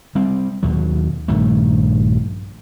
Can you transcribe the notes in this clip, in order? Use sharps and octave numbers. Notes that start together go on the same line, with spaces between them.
G3 C4
D#2 B2 F#3
A#1 G2 D#3 A3